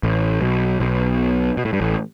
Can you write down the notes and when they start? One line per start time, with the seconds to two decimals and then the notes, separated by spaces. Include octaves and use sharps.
0.03 A1 A2
0.41 B1 B2
0.80 B1 B2
1.57 B2
1.65 A2
1.73 G2
1.81 A1 A2